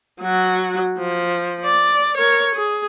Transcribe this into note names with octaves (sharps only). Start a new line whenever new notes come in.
F#3 F#4
F3
D5
A#4 C#5
G#4